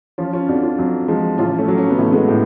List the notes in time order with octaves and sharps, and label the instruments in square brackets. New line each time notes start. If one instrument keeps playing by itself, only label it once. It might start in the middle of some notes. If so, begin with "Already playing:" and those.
[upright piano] F3 C#4 F4
C#4 F4
F2 D4 F#4
C#4 F4
F2 F#3
F3 G#3
A1 C#4 F4
A3 C#4
F#3
C#4
B3
A1 A3
G#3 B3
A2